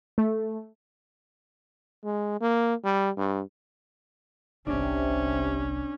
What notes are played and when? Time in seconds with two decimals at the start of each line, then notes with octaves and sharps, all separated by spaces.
0.18 A3
2.04 G#3
2.41 A#3
2.84 G3
3.17 G2
4.67 G1 C2 C3 C#4 D4